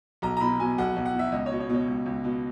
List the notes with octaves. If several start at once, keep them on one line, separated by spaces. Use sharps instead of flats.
B1 A#5
A#5
B2 B5
B2 G#5
B1 F#5
B1
F#5
B2
E5
C#2 D#5
C#5
B2
C#5
B2
C#5
C#2
C#2
B2